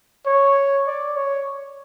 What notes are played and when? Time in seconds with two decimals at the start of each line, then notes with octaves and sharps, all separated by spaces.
0.27 C#5
0.87 D5
1.17 C#5